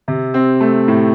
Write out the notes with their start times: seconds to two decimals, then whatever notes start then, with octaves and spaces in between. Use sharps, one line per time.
0.08 C3
0.34 C4
0.61 A3
0.88 A2